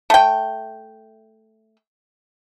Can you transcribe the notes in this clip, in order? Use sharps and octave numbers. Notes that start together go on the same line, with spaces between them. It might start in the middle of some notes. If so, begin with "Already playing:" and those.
A3 G5